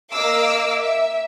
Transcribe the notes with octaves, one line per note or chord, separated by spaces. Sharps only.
A#3 D#5 F5 D6 E6
E5